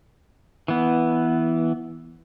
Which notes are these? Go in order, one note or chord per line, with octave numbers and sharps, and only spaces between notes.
E3 B3